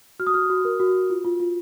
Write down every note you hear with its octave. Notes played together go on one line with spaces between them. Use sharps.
F#4 F6
D#6
F#4 F6
F#4
A#4
F#4
F#4
F4
F4
F4